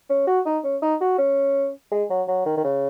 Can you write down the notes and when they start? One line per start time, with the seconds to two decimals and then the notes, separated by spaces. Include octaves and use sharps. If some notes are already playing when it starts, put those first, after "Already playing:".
0.09 C#4
0.27 F#4
0.46 D#4
0.64 C#4
0.82 D#4
1.00 F#4
1.18 C#4
1.91 G#3
2.10 F#3
2.28 F#3
2.46 D#3
2.57 D#3
2.64 C#3